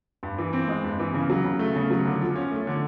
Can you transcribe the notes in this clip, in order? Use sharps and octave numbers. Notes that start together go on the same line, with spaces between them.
G2
E3
C4
G#3
G2
E3
C#3
F#3
C#3
A3
C#3
F#3
D3
F3
C#4
A3
D3